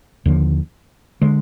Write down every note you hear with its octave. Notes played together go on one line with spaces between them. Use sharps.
D#2 D3 F3
D3 G#3